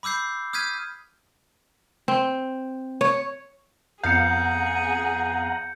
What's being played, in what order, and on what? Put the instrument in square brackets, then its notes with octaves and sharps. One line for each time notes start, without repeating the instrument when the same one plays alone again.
[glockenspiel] B5 D6 E6 G6 C7
D#6 F6 G6 G#6 B6 D#7
[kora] C4
C#5
[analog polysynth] F2 B3 F5 [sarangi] G#4 [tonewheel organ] F#5 A#5 [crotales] G6 C#7